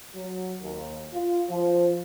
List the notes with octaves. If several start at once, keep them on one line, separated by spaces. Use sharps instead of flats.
F#3
D#2
F4
F3